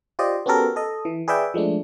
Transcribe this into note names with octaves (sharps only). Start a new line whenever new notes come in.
F4 G4 C5 D5 D#5
B3 C#4 F#4 G4 A4 A#4
A4 D#5
E3
G#4 B4 D5 E5 G5
F3 G#3 A3 D4